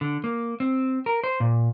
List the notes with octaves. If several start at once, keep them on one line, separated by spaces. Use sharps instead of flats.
D3
A#3
C4
A#4
C5
A#2